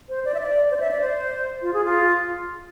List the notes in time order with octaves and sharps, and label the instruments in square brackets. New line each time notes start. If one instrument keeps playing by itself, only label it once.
[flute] C5
D5
E5
D5
C5
D5
E5
D5
C5
F4
G#4
F4